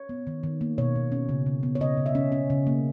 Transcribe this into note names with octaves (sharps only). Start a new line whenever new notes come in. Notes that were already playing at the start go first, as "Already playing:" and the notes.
Already playing: C#5
B3
D#3
D#3
A#3
B2 C#5
B2
C#4
C#3
C#3
B3
C#5
C#3 D#5
C#3
E5
C#4
C#4
C#3
A#3